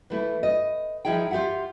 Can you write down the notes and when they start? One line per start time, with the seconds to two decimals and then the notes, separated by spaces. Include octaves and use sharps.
0.10 E3 A3 E4
0.43 D#5
1.05 F3 D#4 E4 G#4 G5
1.31 F4 G4 G#4 E5 F#5